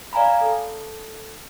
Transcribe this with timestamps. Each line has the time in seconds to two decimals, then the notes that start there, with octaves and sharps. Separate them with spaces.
0.13 D5 F5 G#5 A#5 B5
0.41 A4